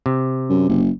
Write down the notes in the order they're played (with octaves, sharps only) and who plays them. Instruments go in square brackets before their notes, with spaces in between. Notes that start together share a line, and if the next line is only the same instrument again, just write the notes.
[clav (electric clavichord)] C3
[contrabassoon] F#2
F#1